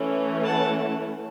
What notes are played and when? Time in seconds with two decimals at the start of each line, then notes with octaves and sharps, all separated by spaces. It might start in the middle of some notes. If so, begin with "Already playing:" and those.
Already playing: E3 A3 C#4
0.46 F#5 A5